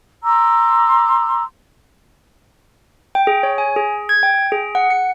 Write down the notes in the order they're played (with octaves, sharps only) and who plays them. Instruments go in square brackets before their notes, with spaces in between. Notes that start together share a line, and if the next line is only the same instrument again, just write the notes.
[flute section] A#5 C6 D6 E6
[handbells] G5
G#4
C#5
G#5
G#4
G#6
G5
G#4
F#5
C#7